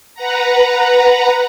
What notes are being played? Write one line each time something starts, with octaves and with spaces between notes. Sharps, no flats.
B4 F#5 A#5